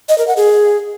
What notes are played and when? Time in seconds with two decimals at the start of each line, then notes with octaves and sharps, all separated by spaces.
0.09 D#5
0.18 A#4
0.27 F#5
0.37 G#4